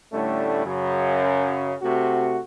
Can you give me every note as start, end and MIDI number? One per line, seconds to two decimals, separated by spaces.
0.13 0.61 45
0.13 0.61 50
0.13 0.61 55
0.13 0.61 57
0.13 0.61 61
0.65 1.73 42
0.65 1.73 49
1.82 2.38 48
1.82 2.38 57
1.82 2.38 66